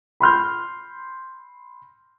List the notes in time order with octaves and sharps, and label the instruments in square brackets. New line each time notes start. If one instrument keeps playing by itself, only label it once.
[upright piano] B5 C6 F6 G6